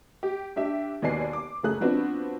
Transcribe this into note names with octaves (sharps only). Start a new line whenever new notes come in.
G4
D4 G4 E5
D#2 B2 B4 D5 G#5 C7
D6
F#1 A3 G#4 F#6
F3 B3 C4 D4 F#4 B4